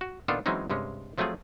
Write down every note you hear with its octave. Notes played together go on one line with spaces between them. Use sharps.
F#4
A#2 D#3 B3 D4 F4 A4
E3 F#3 G#3 C4 C#4 D#4
G2 C3 G#3 C#4
F3 F#3 A3 C4 F4 G#4